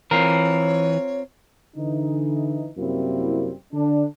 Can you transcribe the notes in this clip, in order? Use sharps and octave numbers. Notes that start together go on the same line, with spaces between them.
E3 C4 F4 A#4 C#5
D3 E3 D#4
F#2 C3 G3 A#3 C4 E4
D3 D4